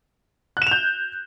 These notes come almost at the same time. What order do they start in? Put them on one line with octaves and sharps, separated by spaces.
F#6 E7 F7 G6